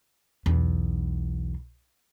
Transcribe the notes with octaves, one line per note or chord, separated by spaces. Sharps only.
B1 E2